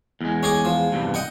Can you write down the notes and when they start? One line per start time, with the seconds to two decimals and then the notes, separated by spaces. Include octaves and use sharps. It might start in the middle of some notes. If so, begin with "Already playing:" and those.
0.21 E2 G#3
0.43 C#4 G#4 D6
0.65 F3
0.92 E2 G2 C3
1.14 D#5 F#5 G5